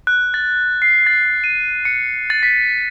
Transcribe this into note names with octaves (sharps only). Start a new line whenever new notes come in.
F#6
A6
C7
A6
D#7
C#7
A6
B6